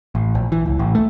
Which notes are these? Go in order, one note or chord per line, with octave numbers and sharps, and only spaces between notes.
A1
A#1
E3
C#2
A1
A3